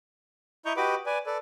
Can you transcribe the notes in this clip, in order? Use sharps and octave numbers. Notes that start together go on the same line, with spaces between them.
E4 D#5 A#5 C#6 G6
F#4 G4 B4 D#5 B5 D6
B4 D5 G#5
A4 B4 D5